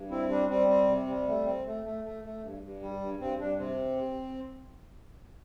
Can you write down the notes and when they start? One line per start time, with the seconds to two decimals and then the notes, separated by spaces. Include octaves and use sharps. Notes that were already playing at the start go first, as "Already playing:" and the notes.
Already playing: G2
0.11 C4 E4
0.29 G3 D4
0.49 G3 C4
0.68 C4
0.88 C3
1.07 G3
1.27 A3
1.46 C4
1.66 A3
1.85 A3
2.04 A3
2.24 A3
2.42 G2
2.62 G2
2.82 G3
3.01 G2
3.20 G2 C4
3.39 G2 D4
3.58 C3 C4